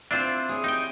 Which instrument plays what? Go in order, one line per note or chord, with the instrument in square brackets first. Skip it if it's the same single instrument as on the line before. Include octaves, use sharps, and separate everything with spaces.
[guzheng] C4 E4 [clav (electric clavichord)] D4 F4 C5
[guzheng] G#4 C#5
[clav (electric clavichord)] D#4 G5 [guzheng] G4 G#5